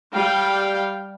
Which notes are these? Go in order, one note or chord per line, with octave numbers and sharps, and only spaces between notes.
G3 F5 G5